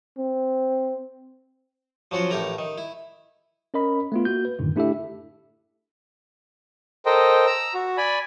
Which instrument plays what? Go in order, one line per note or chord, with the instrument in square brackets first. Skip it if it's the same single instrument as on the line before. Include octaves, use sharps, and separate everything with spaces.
[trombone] C4
[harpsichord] F3 F#3 C#4 F4 F#4
A1 A3 E4 G4 A#4 A#5
D#3
E4
[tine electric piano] C#4 A#4 D#5 B5
A3 B3 F4
A#3 F#4 G6
B4
F#2 A2 D3 D#3
A3 D4 E4 G4 A4 E5
[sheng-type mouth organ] A4 A#4 C5 D#5 G5
A#5 E6
F#4
D5 G#5 B5